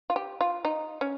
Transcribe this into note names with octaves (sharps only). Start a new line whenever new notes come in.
F4
G4
F4
D#4
C#4